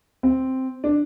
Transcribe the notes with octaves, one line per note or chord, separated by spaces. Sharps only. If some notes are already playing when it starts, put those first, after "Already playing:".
C4
D4